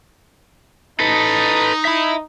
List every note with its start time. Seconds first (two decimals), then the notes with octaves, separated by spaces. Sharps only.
1.00 D#4 A4 B4
1.85 E5 B5